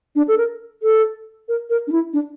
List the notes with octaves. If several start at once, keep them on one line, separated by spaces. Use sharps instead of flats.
D4
A4
A#4
A4
A#4
A#4
D4
E4
D4